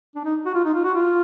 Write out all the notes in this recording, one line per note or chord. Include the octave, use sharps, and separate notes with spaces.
D4
D#4
F#4
F4
D#4
F4
F#4
F4